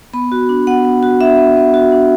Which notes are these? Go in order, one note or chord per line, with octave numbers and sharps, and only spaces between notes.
B3 B5
F#4
D4
B3 F#5
B3
F#4
D4 E5
B3
B3
F#4
D4